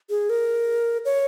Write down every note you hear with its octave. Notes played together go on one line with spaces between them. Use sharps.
G#4
A#4
C#5